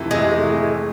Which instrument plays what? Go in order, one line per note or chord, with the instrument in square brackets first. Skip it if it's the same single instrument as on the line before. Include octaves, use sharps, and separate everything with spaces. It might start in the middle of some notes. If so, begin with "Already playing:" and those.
Already playing: [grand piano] F2 C3 E3 A3
[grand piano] F2 C3 E3 A3 [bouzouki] G#3
[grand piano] A2 E3 A3